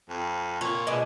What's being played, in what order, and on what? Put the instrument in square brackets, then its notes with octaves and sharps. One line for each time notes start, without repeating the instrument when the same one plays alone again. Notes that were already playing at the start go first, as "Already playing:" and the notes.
[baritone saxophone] F2
[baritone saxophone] A#2 [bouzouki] C#5
[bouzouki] B2 G#3 D4